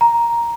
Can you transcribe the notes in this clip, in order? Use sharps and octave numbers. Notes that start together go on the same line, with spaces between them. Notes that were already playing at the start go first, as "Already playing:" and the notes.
A#5